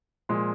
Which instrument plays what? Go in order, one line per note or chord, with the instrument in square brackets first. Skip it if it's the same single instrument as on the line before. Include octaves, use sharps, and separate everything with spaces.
[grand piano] A#2 F3 G#3